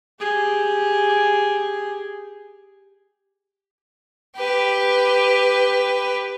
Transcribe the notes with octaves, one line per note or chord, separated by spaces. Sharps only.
G4 G#4
G4 B4